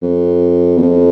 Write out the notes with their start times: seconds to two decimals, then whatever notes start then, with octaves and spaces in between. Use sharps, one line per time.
0.02 F2
0.77 E2
0.82 F2